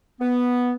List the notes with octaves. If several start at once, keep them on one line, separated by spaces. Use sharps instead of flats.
B3